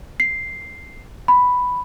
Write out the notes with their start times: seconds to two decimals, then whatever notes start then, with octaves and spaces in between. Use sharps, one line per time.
0.20 C7
1.28 B5